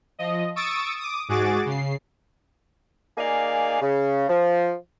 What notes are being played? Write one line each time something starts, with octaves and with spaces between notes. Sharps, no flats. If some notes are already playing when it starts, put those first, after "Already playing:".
F3 D#5
C#6 D#6 E6 A6 D7
D6 D#6
G#2 F#4 G#4 D6 A6
C#3 C7
A#3 D#4 G#4 D5 F5 G#5
C#3
F3